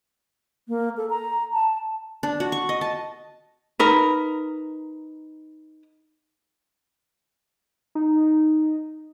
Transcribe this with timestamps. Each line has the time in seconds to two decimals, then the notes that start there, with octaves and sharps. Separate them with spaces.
0.68 A#3
0.97 A4
1.10 A#5
1.54 A5
2.23 D4
2.40 F#4
2.52 C#6
2.69 D#5
2.81 A5
3.79 D#4 A#4 B4
7.95 D#4